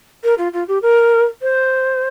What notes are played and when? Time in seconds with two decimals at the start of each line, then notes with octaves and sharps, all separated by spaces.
0.24 A#4
0.37 F4
0.53 F4
0.68 G4
0.82 A#4
1.42 C5